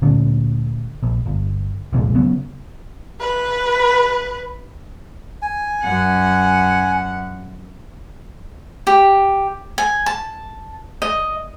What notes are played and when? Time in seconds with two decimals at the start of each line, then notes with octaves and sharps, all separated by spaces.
0.02 D2 A#2 D3 C#4
1.03 A#1
1.26 G1
1.93 C2 F2 A#2 G#3
2.15 C#3 F#3 B3
3.20 B4
5.42 G#5
5.84 F#2 F#5
8.87 G4
9.78 G#5
10.06 A5
11.02 D#5